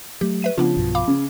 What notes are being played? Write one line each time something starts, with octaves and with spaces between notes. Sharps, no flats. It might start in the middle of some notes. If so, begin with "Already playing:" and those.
F#3 A3 G4
B4 E5 D#7
C#3 F3 B3 D4 F4
B1 G2 B2
F5 B5 D6
C#3 C#4